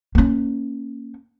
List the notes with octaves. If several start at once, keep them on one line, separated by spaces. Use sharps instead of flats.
A#3 C#4